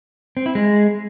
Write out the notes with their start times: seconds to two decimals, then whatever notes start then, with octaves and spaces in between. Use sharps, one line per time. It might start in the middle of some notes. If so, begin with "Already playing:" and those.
0.37 C4
0.46 E4
0.55 G#3